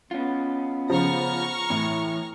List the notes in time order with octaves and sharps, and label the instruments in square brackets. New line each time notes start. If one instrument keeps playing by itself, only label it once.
[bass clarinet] B3 [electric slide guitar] C#4 F4
[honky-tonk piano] C#3 F3 [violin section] A#5 C#6 F6
[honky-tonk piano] A2 [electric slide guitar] E3